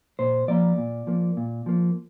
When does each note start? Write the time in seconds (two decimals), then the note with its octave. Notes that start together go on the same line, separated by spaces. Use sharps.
0.19 A#2 C5
0.48 F3 A#3 D5
0.78 A#2
1.07 F3 A#3
1.37 A#2
1.66 F3 A#3